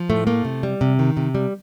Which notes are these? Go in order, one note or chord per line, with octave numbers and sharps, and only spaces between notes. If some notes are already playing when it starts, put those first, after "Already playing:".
Already playing: F3
A2 A3
A3 A#3
C3
G3
C3
D#3
C3
G3